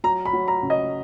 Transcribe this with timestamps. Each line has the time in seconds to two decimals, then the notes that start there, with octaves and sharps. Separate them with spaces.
0.04 F#3 A#5
0.25 B5
0.33 F#3
0.48 A#5
0.62 C#3
0.70 D#5